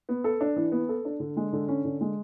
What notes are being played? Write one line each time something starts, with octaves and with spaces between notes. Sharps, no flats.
B3
A4
D4
E3
B3
A4
D4
D3
G#3
D3
C#4
D3
G#3